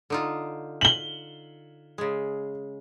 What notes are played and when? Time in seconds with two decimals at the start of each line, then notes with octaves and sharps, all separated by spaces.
0.10 D3 D#4 F4
0.81 F#7 G7
1.98 C#3 G#3